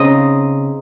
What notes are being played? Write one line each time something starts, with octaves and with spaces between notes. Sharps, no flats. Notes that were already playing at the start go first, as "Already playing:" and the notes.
Already playing: C#3 C4 D#4 D#5